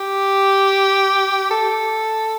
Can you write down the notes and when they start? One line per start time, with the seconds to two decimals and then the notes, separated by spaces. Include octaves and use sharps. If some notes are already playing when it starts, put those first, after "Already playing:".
Already playing: G4
1.51 A4